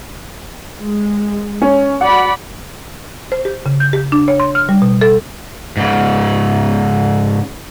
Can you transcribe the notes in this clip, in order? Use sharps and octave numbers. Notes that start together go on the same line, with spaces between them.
G#3
C#4
F#4 D5 F#5 B5
C5
G4
C#3
G6
G4
D4
C#5
C6
F6
G3
B2
A4
G#2 C#3